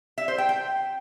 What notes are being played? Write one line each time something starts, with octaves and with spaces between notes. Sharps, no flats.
E5
C5
G5
G5